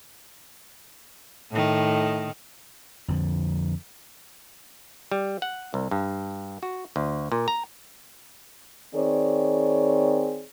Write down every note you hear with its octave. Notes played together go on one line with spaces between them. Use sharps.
A2 D#3
F2 D3 F3
G3
F#5
C2
G2
F#4
D2
A#2
A#5
D#3 C4 G#4 C#5 D5